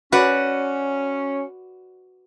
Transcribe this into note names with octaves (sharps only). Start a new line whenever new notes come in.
C#4 F#4 B4 D5